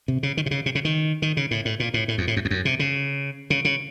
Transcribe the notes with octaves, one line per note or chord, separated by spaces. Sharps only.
C3
C#3
D#3
C3
C#3
C3
C#3
D#3
D#3
C#3
A2
A2
A#2
A2
A2
F2
A2
F#2
F2
F#2
C3
C#3
C#3
C#3